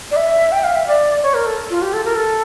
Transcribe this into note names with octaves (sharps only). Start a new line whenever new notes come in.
D5
E5
G5
F5
E5
D5
C#5
A#4
A4
F4
G4
A4
A#4
A4